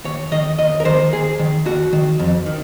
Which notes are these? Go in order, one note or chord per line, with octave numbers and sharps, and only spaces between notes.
D#2 C#5
D#3 D#5
D#2 D#5
A#4
D#3 C5
D#2 G#4
D#3
D#2 F#4
D#3
F2
D#3